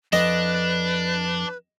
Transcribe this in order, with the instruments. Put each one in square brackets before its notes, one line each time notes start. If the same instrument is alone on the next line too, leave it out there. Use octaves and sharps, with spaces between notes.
[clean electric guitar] F2 [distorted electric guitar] D4 [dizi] B4 [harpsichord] D#5